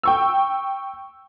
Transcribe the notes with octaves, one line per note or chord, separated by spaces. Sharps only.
G5 C#6 E6